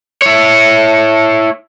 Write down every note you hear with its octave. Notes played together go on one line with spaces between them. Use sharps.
E4 C#5